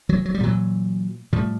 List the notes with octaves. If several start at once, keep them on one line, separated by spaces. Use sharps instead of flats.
E3 F#3
F#3
G3
A#2 E3 F#3
A2 F3 G3